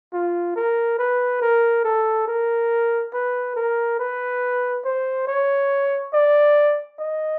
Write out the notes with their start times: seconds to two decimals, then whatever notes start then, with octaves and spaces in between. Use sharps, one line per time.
0.13 F4
0.56 A#4
0.99 B4
1.42 A#4
1.84 A4
2.28 A#4
3.14 B4
3.56 A#4
3.99 B4
4.85 C5
5.27 C#5
6.13 D5
6.99 D#5